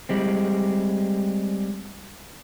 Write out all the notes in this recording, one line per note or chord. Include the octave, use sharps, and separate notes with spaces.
G3 G#3 C4